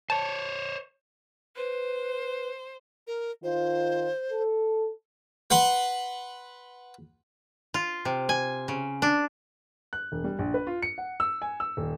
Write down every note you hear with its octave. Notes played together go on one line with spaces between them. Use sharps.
C5 C#5 A5
B4 C5
A#4
D#3 F4 C5
A4
B4 F#5 C6
F4
C3
G#5
C#3
D4
F#6
E1
G3
A#1
B4
F4
C#7
F#5
E6
G#5
E6
D#1